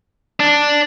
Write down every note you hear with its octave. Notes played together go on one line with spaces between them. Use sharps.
D4